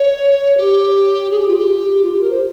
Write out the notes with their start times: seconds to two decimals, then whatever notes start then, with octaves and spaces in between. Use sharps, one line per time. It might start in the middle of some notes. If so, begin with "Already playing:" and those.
Already playing: C#5
0.57 G4
1.31 G#4
1.39 G4
1.48 F4
1.56 G4
2.03 F4
2.12 G4
2.21 A#4
2.30 C5